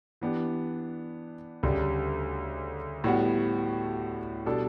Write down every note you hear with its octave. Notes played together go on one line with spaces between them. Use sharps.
E3 B3 D4 G4
D2 C#3 G3 D4 G4
A2 G3 B3 F#4
B2 G3 D4 A4